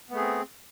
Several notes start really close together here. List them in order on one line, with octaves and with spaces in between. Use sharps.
B3 A3 G#4 C4